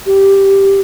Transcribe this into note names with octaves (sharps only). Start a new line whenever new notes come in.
G4